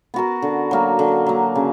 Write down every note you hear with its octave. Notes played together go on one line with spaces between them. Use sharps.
B3 F#4 A#4
D3
F#3 A#3
D3
F#3 A#3
C#3